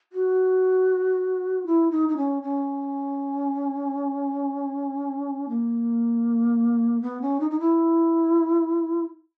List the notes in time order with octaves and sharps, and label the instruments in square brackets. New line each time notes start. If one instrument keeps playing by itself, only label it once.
[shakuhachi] F#4
E4
D#4
D#4
C#4
C#4
A#3
B3
C#4
D#4
D#4
E4